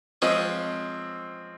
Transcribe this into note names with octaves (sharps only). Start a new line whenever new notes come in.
F3 G#3 C4 C#4